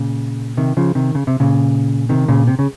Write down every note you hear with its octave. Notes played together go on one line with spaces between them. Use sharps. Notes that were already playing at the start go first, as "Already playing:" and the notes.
Already playing: A#2 C#3
C3 D#3
C#3 F3
C3 D#3
C#3
C3
A#2 C#3
C3 D#3
A#2 C#3
C3
C#3